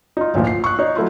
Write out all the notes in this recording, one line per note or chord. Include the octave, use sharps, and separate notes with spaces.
D#4 F4
A1 D2 A#2 F3
C7
C#6 D#6 F#6
D#4 C#5
F#3 A3 E4 F4